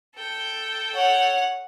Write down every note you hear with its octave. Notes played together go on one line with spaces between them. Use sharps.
A4 G5
C#5 F#5